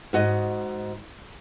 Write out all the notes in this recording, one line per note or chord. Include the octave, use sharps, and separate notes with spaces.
G#2 F#4 D#5